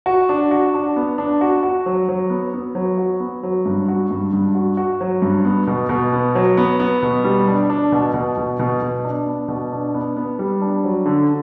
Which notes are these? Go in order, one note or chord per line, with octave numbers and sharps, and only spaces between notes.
F#4
D4
F#4
D4
B3
D4
F#4
F#4
F#3
F#3
B3
B3
F#3
F#4
B3
F#3
G2
F#4
G2
G2
F#4
F#4
F#3
G2
B3
B2
B2
B3
F#3
B3
B3
B2
G3
D4
D4
B2
B2
B2
B2
B2
D4
B3
B2
D4
B3
B3
G3
D4
F#3
D3